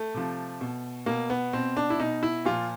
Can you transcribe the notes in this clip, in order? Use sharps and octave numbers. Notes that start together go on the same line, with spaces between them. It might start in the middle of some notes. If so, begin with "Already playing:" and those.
Already playing: A3
C3 F3
B2
B2 A#3
B3
B2 C4
D4
E4
B2 D#4
E4
A#2 F3 F4